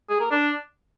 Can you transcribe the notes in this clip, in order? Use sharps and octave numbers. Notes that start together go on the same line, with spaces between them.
G#4
A#4
D4